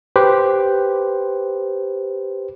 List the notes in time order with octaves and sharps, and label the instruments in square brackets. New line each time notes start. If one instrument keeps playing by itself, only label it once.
[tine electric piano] G4 B4 C5